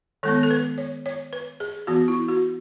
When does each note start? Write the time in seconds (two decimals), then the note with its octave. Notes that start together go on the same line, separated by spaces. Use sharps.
0.23 D#3 G#3 B3 A4
0.43 A4
0.50 B4
0.78 C#5
1.06 C#5
1.33 B4
1.60 G#4
1.87 E3 B3 F#4
2.08 E4
2.28 F#4